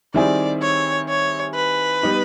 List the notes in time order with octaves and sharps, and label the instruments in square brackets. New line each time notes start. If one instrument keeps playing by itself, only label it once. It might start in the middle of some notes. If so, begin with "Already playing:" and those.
[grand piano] D#3 G3 C4 E4 G#4 [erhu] D5
[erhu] C#5
C#5
B4
[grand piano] G3 B3 D#4 G4